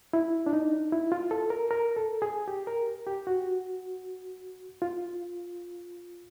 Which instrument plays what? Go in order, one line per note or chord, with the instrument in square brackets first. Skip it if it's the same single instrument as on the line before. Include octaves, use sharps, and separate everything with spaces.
[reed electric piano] E4
D4
D#4
E4
F4
A4
A#4
A#4
A4
G#4
G4
A#4
G4
F#4
F4